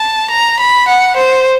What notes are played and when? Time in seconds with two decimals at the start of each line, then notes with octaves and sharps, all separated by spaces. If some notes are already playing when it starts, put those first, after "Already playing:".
Already playing: A5
0.30 A#5
0.60 B5
0.88 F#5
1.17 C5